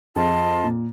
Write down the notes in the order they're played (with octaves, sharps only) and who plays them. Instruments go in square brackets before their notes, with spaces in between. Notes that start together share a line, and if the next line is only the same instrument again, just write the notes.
[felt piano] F2 F3 G#4 [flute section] F4 D#5 A5
[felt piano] A#2